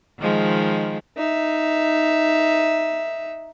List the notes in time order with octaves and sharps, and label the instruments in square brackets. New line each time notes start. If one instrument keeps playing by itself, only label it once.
[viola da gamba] D#3 F3 G#3
[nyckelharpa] D#4 E5